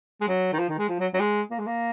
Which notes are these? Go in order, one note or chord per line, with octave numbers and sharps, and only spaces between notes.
G#3
F#3
D#3
F3
D#3
G#3
F3
F#3
F#3
G#3
A#3
G#3
A#3